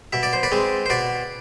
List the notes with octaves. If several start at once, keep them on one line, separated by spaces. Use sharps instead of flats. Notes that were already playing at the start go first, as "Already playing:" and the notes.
B2 E5
D5
C5
B4 D5
G#3 C4
C5
B2 B4 D5